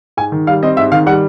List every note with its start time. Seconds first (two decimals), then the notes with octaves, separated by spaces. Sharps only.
0.17 G#2 G#5
0.32 D#3
0.47 G3 F5
0.63 C4 D#5
0.77 G#2 E5
0.92 D#3 F5
1.06 G3 F#5